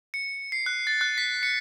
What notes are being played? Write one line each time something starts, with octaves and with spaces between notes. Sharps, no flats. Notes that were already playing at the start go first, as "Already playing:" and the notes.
C#7
C7
F#6
A6
F#6
B6
C#7